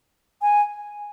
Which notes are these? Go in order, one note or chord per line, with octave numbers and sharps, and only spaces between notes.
G#5